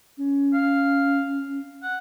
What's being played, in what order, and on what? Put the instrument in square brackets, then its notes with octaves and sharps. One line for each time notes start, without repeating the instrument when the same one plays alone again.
[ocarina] C#4
[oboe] F5
F#5